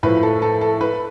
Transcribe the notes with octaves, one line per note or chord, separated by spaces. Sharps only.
A2 F3 B4
A4
A4
A4
B4